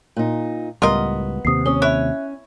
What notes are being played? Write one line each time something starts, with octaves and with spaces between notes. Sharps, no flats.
A#2 D#4
C#2 A2 G3 B3 F4 A#4 D#5
D#2 C3 D#6 C7
C#4 C#5 D#6 G7
E4 C#5 E5 F#6